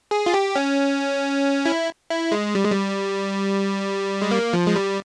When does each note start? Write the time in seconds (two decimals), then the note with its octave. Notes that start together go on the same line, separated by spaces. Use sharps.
0.11 G#4
0.26 F4
0.34 G4
0.56 C#4
1.66 E4
2.10 E4
2.32 G#3
2.55 G3
2.63 G#3
2.72 G3
4.22 G#3
4.31 A#3
4.53 F3
4.67 G#3
4.76 G3